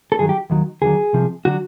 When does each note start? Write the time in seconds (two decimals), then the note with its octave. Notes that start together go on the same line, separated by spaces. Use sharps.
0.12 A4
0.19 G2 D#3 F#3 G#4
0.29 G4
0.50 D#2 D#3 F#3
0.82 D#2 D3 F#3 G#4
1.13 C2 C3 F3
1.45 D3 F#3 F#4